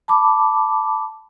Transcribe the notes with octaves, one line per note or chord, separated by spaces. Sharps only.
A5 B5 D6